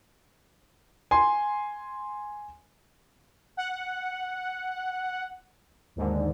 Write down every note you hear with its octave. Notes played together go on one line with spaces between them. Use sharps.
G#5 C6
F#5
D#2 G#2 D3